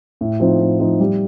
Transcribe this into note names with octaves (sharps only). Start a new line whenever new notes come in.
A2
F3 C4 D#4
A2
F3 C4 D#4
G3